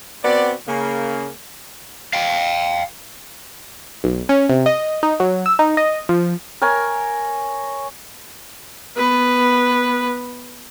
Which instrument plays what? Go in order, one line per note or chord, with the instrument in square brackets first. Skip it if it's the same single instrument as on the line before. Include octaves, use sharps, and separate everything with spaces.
[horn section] B3 C4 F#4 D5
C#3 A#3
[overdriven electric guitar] F5 G5
[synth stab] B1
C#4
C3
D#5
D#4
F#3
E6
D#4
D#5
F3
[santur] A#4 C#5 G#5
[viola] B3 B4